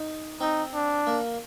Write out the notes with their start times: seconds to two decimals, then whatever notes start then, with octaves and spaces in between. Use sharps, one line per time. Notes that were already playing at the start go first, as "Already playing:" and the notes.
Already playing: D#4
0.40 C4 D#4
0.74 D4
1.07 A#3